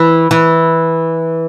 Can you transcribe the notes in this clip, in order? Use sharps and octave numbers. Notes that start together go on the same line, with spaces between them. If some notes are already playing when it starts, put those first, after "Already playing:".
Already playing: E3
E3